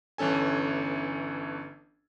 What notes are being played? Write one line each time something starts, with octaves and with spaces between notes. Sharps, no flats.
G1 E3 C#4 A4 G#5